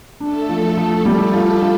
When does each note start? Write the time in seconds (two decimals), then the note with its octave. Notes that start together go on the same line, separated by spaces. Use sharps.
0.20 A3 D4 A4
0.49 F3
0.77 F3
1.05 G3
1.34 F4
1.63 F4